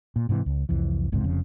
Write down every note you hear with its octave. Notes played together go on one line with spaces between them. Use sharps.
A#2
G#2 C3 D#3 E3
C#2
C2 F2 E3
G1 C#2 G#2 C3
F1 F2 C#3